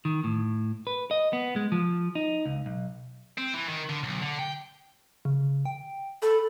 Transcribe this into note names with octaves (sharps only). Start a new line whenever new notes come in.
D#3
A2
B4
D#5
B3
G#3
F3
D#4
C#2
B1
C4
E3
D#3
D3
B1
D3
G5
C#3
G5
A4 B5